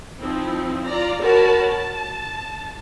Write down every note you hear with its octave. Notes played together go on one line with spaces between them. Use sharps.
F3 C4 D#4 E4
F4 D5 A#5
F#4 A#4 C#5 A5 B5
A5